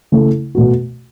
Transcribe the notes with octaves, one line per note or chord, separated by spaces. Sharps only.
C#3 A3 E4 A4
B2 A3 F#4